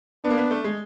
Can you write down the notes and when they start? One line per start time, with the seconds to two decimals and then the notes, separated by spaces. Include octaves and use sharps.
0.24 B3 D4
0.30 A#3
0.38 B3
0.51 A3
0.64 G#3